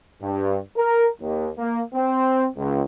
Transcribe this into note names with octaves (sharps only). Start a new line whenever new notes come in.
G2
A#4
D#2
A#3
C4
C#2